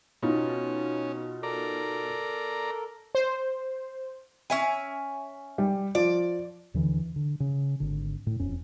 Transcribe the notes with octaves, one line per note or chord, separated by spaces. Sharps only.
B2 C#4 D#4 F4
A4 A#4 D5 A#5
C5
C#4 E5 G#5
G3
F3 D5
D#2 D3 E3
D3
C#3
G#1 D3
A2
E1 F2 C#4